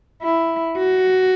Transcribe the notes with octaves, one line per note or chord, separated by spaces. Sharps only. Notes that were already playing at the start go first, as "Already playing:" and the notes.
E4
F#4